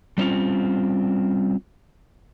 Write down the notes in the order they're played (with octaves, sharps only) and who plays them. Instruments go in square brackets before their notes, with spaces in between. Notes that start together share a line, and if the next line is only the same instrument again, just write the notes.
[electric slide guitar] G3 C4 C#4 F4